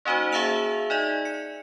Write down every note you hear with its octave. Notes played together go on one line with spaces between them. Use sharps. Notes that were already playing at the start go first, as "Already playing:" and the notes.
A#3 C#4 D#4 F#4 C5
G#4 E5 F5 A5 E6 F7
D#4 D5 D#5
C#7